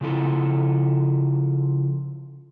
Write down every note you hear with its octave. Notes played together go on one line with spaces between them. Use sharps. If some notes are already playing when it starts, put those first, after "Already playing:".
C#3 F3 E4 A4